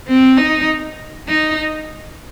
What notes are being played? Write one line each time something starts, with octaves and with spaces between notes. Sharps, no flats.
C4
D#4
D#4